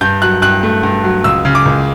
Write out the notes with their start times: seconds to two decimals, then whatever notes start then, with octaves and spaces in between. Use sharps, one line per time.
0.01 G2 G6
0.22 F#3 F#6
0.42 G2 F#6
0.63 A3
0.83 G2
1.04 F#3
1.24 C#2 E6
1.45 C#3
1.55 D6
1.65 C#2